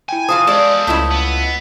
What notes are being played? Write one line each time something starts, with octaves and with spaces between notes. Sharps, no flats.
E4 G5 G#5
E3 F4 C5 F5 A5 D#6
G#3 A4 C5 D5
C#2 A3 C#4 E4 F4 D#5
B3